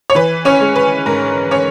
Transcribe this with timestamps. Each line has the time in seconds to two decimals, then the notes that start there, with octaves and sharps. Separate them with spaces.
0.10 C#5
0.15 E3 B4
0.45 C#4 C#5
0.61 G#3
0.76 B4
1.06 G#2 A#4
1.51 C#4 C#5